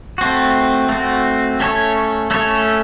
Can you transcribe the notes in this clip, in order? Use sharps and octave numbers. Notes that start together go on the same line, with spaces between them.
A3 C4 F#4
A3 C4 F#4
A3 C#4 A4 C#5
A3 C#4 A4 C#5